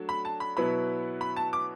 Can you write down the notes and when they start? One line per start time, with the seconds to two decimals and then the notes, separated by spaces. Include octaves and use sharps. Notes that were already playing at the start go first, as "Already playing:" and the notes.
Already playing: F#3 A3 D4
0.09 B5
0.25 A5
0.40 B5
0.57 B2 F#3 B3 E4 B4 B5
1.21 B5
1.36 A5
1.53 D6